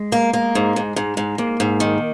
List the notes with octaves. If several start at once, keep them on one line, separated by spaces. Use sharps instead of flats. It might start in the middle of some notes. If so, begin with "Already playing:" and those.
Already playing: G#3
A#3
A#3
G#2
G#2
G#2
G#2
G#2 A#3
G#2
D#3